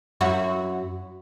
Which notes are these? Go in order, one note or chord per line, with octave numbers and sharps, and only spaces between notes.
F#2 E4 F#4